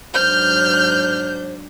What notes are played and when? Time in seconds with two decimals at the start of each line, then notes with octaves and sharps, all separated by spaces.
0.14 G#2 F#3 D4 C5 F6 G6